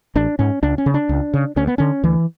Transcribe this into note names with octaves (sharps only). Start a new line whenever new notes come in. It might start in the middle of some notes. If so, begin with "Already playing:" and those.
A1 D4
G#2 C#4
C#2 D4
C#4
C#3
D4
C#2
C#3
D2 C#4
B3
D3 C#4
D2 E3